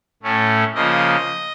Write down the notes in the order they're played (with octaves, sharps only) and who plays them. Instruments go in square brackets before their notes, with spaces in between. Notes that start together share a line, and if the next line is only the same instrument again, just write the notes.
[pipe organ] A2 A3 C#4
C#3 F3 A#3 D#5